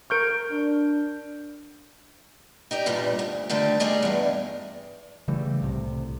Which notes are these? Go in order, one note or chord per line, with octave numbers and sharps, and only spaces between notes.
A#4 C#6 F6 G6 D7
D4
D#4 G4 D5
E2 G2 A#2 G3
D2
D3 D#3 G3 A3
A#2 G3 D#4 G#4 C#5
E2 G2
C#3 E3 G3 A3
C2 A2 C3